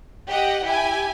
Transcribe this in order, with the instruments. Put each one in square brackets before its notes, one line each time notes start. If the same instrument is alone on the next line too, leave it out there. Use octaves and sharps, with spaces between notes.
[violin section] G4 D#5 F#5
E4 G4 G#5